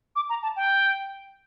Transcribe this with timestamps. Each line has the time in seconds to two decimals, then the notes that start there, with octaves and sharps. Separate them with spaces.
0.16 D6
0.29 A#5
0.42 A5
0.56 G5